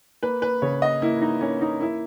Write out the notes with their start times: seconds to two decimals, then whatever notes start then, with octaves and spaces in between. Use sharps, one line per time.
0.23 A#3 B4
0.42 B4
0.62 C#3 C#5
0.82 D#5
1.02 A#3 E4
1.22 D#4
1.41 A#3 C#4
1.61 D#4
1.80 A#3 E4